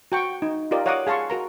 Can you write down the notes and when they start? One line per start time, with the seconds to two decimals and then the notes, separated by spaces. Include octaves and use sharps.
0.12 F#4 G5 C#6
0.42 D#4
0.71 F4 G4 A#4 D5 D#5
0.86 C#5 F5 F#5 A#5 D6 D#6
1.07 G#4 F5 A5 C6 C#6
1.30 F#4 A#4 A#5